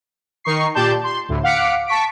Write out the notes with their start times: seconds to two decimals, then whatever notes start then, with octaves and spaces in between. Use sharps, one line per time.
0.44 D#3 D#4 C#6 C7
0.74 A#2 G4 D5 A5 C6 G6
1.04 C6
1.29 D2 A2
1.43 F5 F#5 D6 B6 C#7 D7
1.87 A5 C#6 B6 D7